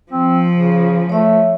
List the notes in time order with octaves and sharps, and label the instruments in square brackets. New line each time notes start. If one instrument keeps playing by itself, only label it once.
[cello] F3 [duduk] C4
[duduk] C#3
[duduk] A3 [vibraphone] C#5 E5